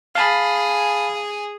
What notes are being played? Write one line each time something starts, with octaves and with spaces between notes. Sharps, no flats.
G#4 F5 A5 B5